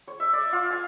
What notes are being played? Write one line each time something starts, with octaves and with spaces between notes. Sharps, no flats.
C#5
E5
D5
F4
G#5